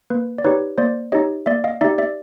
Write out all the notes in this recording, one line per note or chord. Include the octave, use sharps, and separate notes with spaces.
A#3 B4
D5
D#4 G4 B4 C#5
A#3 C5 D5
D#4 G4 C#5 D#5
A#3 D5 E5
D#5 F5
D#4 G4 D5 E5
D5 E5